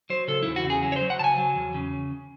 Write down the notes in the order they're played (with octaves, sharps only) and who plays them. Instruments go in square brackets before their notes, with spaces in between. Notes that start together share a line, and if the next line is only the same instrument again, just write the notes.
[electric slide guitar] F#3 C5
C#3 A4
E2 E4
F#4
C#3
G#4
F#3
C#5
C5
F#3
F#5
C#3 G#5 A5
F#3
E2
C#3